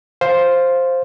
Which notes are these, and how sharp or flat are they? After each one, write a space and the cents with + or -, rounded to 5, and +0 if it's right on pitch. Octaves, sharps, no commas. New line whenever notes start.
C5 +5 F5 +0